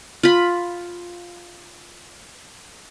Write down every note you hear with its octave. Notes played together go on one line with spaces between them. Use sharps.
F4 B5